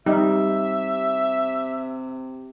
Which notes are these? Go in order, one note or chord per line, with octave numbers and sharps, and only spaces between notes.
C3 G3 D#4 E5